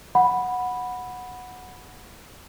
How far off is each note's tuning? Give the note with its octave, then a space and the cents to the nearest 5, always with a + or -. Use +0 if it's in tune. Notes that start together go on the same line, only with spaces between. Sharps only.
F#5 -15 B5 +0